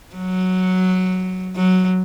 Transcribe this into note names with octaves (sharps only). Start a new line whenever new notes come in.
F#3
F#3